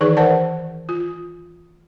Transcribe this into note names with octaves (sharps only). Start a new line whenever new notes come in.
D#3 E3 D#4 G#4 B4 D5
A#4 C5 D5 F#5 A5
F4